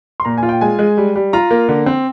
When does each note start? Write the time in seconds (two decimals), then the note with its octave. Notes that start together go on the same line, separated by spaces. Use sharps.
0.20 C6
0.25 A#2 A#5
0.38 G#5
0.43 F4
0.49 G5
0.61 G#3 G#5
0.79 G#3
0.98 G3
1.16 G3
1.33 F4 A#5
1.51 A#3
1.69 D3
1.86 C4